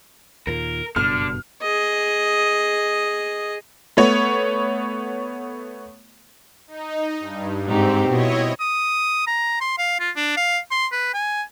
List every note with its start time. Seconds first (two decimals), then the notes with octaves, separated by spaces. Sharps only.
0.47 D#2 A#2 A#4
0.96 F#1 G2 B2 D3 F6
1.62 G#4 D#5
3.97 A3 B3 C#5
6.67 D#4
7.20 G2
7.68 G#2 C4 D#4 G4
8.09 B2 E4 C#5 D#5
8.60 D#6
9.27 A#5
9.61 C6
9.78 F5
10.00 F4
10.16 D4
10.37 F5
10.71 C6
10.92 B4
11.14 G#5